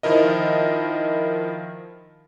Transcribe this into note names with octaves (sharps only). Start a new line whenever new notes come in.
D#3 F3 E4 A#4 D#5